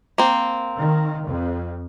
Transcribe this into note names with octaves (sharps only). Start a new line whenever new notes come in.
A#3 C4
D#3
F2